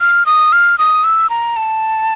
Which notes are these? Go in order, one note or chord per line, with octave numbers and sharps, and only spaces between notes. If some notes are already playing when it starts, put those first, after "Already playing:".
F6
D#6
F6
D#6
E6
A#5
A5